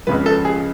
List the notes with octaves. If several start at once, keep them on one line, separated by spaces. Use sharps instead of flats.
C#2 C#3 F3 B4
A4
G#4